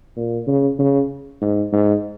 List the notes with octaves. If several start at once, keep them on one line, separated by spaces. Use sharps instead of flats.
A#2
C#3
C#3
G#2
G#2